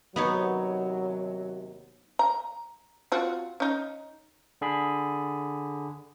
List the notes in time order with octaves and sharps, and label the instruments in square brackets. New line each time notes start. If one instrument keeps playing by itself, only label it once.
[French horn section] D#2 C3 F#3 [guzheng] B3 D#4 C#5
[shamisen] A#5
C4 F4 F#4
C#4 D#4
[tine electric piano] D3 G#4 B5